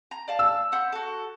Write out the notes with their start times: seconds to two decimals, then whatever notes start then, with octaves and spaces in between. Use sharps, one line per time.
0.11 A#5
0.28 D5 F5 A5
0.39 E6
0.72 C5 F#5 B5
0.92 F#4 A4